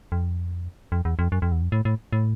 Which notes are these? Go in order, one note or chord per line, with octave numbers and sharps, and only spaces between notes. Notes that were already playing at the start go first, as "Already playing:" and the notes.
F2
F2
E2
F2
F#2
F2
E2
F2
A2
A2
A2